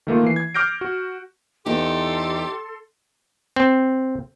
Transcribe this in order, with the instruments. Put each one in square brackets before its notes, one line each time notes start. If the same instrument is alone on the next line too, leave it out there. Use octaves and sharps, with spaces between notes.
[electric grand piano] D#3 A3 A#3 F4
E3 C7
G#6
D6 F6 G6 A#6 D7
F#4
[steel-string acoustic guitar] E2 D#4 [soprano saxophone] G4 [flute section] A4 C6
[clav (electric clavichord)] C4